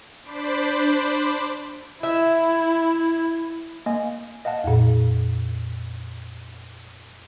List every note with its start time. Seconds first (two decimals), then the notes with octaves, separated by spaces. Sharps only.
0.23 D4 C5 B5 D6
2.03 E4 E5
3.86 A#3 D#5 G#5
4.45 D#5 F5 F#5 A5
4.64 F2 A#2